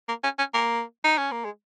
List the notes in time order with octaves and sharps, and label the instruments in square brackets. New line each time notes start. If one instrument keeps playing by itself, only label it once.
[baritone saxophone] A#3
C#4
C#4
A#3
D#4
C#4
A#3
G#3